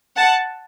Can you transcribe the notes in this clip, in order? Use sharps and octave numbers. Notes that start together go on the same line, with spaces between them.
F#5 A5